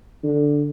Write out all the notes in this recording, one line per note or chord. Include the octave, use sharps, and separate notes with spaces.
D3